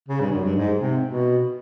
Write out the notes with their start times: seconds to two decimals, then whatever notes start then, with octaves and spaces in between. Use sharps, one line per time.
0.08 C#3
0.20 G2
0.32 F#2
0.44 G2
0.56 G#2
0.79 C3
1.03 B2